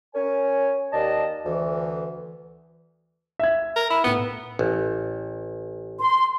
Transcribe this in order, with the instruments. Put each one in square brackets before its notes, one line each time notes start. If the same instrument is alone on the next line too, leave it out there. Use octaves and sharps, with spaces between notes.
[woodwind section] C#4 A#4 C#5 G#5
D#2 D5 D#5 A5
D2 E3
[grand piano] E5 G#6
[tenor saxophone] A#4
E4
[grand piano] A2 G7 [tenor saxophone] B3
[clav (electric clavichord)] A1
[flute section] C6